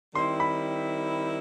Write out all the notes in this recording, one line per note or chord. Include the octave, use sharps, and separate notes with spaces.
D#3 G3 C4 E4 C6
B5